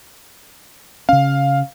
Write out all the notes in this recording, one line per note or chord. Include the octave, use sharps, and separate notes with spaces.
C#3 C#4 F5